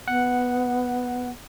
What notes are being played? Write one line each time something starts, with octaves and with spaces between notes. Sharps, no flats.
B3 F#5